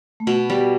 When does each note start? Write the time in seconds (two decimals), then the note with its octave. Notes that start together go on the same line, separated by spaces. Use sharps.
0.20 A3
0.27 B2 B3
0.50 G3